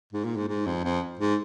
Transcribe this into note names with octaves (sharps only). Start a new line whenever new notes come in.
G#2
A#2
G#2
G#2
F2
F2
G#2